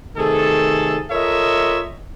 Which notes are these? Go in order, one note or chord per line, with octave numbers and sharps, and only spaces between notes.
C3 D#3 A3 G#4 A4
F4 A4 A#4 C#5 D#5 E5